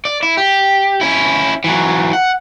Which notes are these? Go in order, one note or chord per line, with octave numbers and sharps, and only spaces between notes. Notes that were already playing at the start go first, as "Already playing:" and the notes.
D5
E4
G4
C#4 E4
E3 F#3
F#5